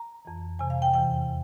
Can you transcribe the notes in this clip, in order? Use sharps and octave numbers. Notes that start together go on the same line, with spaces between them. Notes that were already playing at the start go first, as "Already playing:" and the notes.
Already playing: A#5
F2 E3
F2 C3 E3 G#5
F5
G5
E2 C3 E3 G5